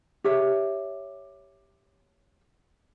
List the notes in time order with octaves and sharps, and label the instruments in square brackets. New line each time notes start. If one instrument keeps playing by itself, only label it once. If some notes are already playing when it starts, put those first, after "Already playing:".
[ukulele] G4 C#5 E5